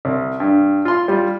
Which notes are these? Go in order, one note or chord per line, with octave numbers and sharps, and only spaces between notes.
C2
G2
F4 C6
G3 F4